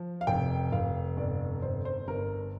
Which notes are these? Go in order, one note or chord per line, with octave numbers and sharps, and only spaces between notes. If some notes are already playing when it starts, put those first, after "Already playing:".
Already playing: F3
F5
F1 G5
F1 F5
G1 D5
G1 C5
C5
G1 A#4